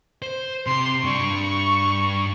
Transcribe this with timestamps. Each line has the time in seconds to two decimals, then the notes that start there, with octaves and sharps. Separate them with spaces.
0.22 C5
0.67 C3 C6
1.04 G2 D4 C#6